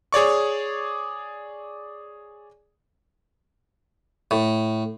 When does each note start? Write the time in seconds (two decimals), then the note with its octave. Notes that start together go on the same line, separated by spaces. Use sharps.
0.12 G#4 C#5 D5 C#6
4.31 A2